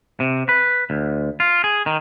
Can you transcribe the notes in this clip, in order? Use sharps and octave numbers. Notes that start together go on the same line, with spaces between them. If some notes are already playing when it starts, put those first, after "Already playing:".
C3
B4
D2
F4
G#4
D#3